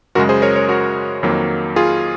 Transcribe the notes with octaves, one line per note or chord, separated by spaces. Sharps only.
F#2 C#3 G#3 F#4 A#4
G#4 C5
A#4 C#5
A#4 C#5
F#4 A#4
F2 D#3 F#3 A#3
F4 G#4